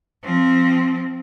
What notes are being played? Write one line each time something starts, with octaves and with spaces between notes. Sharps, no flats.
F3 C4